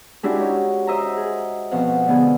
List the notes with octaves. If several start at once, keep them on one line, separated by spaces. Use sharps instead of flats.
G#3 C#4 D4 E4 F#4 G4
D#4 C#5
C5 D#5 E5 F#5 A#5
G#4
F2 B2 F3 C4 F5 F#5
D3 G#3 B3 G#4